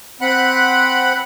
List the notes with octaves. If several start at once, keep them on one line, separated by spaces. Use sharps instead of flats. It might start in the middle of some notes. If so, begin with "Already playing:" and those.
C4 F#5 B5 F#6